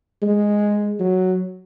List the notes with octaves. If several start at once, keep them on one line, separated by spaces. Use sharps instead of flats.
G#3
F#3